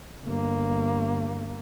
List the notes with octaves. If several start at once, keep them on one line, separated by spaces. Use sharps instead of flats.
G1 A#3